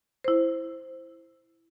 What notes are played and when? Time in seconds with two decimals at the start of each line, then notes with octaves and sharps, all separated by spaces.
0.24 E4 C5